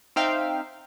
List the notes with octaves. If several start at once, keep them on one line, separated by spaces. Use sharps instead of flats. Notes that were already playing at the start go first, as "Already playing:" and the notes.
C4 D#4 E5 F5 G5